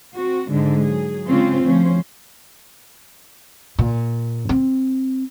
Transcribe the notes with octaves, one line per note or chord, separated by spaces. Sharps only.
C4 F#4
G#2 D3 G#3
F#3 G#4
C#3 G#3 C4 C#4 F4 C5
D2 F3 C#4 C5
A#2
C4